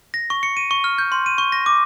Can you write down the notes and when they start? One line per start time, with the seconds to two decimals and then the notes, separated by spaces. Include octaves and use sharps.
0.14 A#6
0.30 C#6
0.43 C#7
0.57 D#7
0.71 C#6
0.84 F6
0.98 G6
1.12 C6
1.26 D#7
1.38 C#6
1.52 A#6
1.66 D6